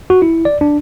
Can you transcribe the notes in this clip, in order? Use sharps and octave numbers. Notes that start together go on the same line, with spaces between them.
F#4
E4
D5
D4